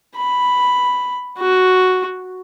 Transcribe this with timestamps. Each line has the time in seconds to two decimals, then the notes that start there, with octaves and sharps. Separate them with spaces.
0.17 B5
1.38 F#4